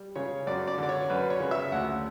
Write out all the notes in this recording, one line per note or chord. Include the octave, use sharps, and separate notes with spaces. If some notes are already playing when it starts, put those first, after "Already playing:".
Already playing: G3
C#3 C#5
F#2 D5
D5
D3 D5
C#5
F#2 B4
C#5
C#3
E5
D2 F#5